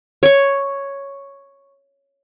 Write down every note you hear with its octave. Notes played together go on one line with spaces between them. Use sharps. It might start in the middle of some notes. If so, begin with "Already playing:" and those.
C#5 C#6